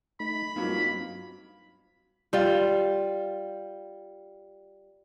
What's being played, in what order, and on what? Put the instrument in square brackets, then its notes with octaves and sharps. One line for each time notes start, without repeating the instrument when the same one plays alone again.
[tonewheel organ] A3 D#4 [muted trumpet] B5
[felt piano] G2 F#3 A#3 [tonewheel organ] C4 D#4 F4
[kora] G3 F4